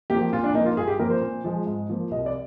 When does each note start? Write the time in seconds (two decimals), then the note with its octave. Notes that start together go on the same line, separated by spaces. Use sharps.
0.10 F3 A#3 G4
0.33 A#2 F4
0.44 D4
0.54 F3 A#3 D#4
0.66 F4
0.77 G2 G#4
0.88 G4
0.99 F3 A#3 A#4
1.10 C5
1.21 A#2
1.44 F3 G#3
1.67 G#2
1.89 F3 A#3
2.11 C2 D#5
2.26 D5